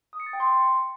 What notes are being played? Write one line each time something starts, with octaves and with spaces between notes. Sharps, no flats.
D#6
C#7
A6
G5
C6